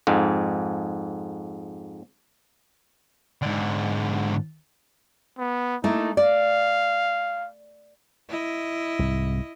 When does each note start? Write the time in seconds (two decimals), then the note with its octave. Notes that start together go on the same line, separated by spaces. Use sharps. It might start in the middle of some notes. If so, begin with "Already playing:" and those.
0.07 F2 G#2
3.42 G#2 D3
5.38 B3
5.84 A3 A#3 D#4 E4
6.17 D5 F5
8.29 E4 D#5
8.99 C2 G#2